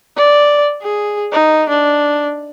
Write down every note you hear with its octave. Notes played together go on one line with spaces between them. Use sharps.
D5
G#4
D#4
D4